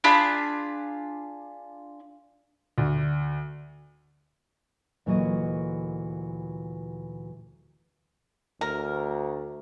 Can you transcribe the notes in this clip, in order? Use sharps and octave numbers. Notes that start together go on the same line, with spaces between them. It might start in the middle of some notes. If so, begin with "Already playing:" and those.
D4 F4 G#4 B5
D2
D2 A#2 E3 F#3 A3 D#5
D2 A#4